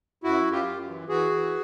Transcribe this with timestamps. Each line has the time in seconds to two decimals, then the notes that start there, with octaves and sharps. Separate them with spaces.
0.24 F#2 E4 F#4
0.45 F#2
0.52 F4 G4
0.66 F#2
0.87 E3
1.08 E3 F#4 G#4
1.30 E3